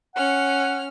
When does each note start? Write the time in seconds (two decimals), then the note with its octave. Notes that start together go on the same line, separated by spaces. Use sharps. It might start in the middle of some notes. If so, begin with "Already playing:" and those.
0.15 C#4 F#5 F6